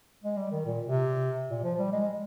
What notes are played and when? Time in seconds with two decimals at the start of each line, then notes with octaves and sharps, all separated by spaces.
0.23 G#3
0.37 G3
0.51 D#3
0.66 A#2
0.87 C3
1.50 A#2
1.64 F3
1.79 G3
1.92 G#3